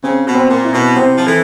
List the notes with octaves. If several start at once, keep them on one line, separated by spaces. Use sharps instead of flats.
C#3 C4
B2
C4
A#2
E4
B2
C3 C4
F3
E3 A4